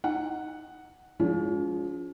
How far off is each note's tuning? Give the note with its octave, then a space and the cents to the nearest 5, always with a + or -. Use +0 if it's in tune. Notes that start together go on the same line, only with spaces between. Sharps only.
D#4 +0 F#5 +0
F3 +15 G#3 +0 C#4 +45